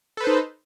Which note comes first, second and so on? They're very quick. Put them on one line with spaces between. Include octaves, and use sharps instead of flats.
A4 B4 C5 D#4